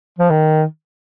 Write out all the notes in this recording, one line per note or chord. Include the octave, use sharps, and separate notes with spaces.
F3
D#3